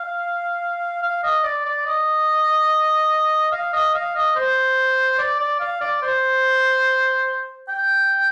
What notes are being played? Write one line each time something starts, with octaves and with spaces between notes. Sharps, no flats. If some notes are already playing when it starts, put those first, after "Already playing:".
Already playing: F5
F5
D#5
D5
D5
D#5
F5
D#5
F5
D#5
C5
D5
D5
F5
D5
C5
G5